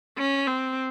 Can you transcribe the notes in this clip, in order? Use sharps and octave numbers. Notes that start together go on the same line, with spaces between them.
C#4
C4